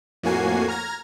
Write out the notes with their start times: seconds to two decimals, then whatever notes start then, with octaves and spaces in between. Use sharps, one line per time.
0.23 F2 A2 A#3 F#4 G#5 C7
0.68 A#5 F6 G#6 A#6